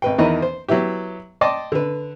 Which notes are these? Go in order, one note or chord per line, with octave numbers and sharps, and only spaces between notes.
G#1 B4 G5
E2 D#3 E3 D#5 A#5 B5
C5
F#3 B3 E4 G4
D5 D#5 G5 A5 C6 D6
D3 B4